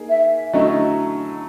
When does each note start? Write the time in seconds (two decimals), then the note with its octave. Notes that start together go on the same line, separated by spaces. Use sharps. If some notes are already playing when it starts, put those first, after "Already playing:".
Already playing: A#3 D#4 G#4
0.09 E5
0.53 D3 F#3 A3 C#4 E4 D#5